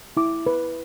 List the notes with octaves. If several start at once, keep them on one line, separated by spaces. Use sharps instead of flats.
E4 D6
B4